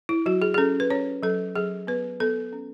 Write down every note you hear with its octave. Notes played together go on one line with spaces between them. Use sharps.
E4
F#3 F#4
G#4
G#4
C#4 A4
B4
C#4 C#5
F#3 A4
F#3 G#4
B3 B4
B3 A4
C#4